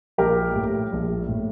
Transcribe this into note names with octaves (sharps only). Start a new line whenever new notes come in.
A#1 G4 A#4
A2
A#1
A2